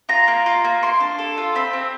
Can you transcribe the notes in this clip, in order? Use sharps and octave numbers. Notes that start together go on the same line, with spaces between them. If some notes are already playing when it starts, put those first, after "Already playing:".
F4 A#5
A#3
F4
A#3
A#3 C6
D4
A4
F4
C4 B5
C4